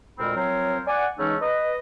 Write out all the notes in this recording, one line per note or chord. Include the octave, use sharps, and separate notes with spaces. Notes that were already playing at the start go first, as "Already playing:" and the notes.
D2 A#2 G#3 C4 A#4 B5
F3 F#3 C4 A#4 C5 C#5
D5 F#5 G#5
C#3 E3 G#3 A3 C#4 D#4
B4 D#5